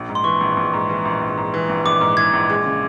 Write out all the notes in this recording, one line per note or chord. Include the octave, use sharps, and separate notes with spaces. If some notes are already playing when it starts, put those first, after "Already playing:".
Already playing: A#1
G#2
C6
E3 C#6
A#1
A#1
G#2
E3
A#1
A#1
G#2
E3
A#1
A#1 D6
G#2
E3 G#6
A#1
G#3
C#3